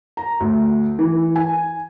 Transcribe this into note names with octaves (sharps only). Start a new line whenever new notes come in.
A#5
D2
E3
G#5